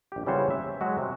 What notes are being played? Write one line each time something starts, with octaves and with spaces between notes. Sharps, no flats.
A#1 G4
C#3 E3 G3 F#4 C5 C#5
E5
F#3 G#3 F#4
C3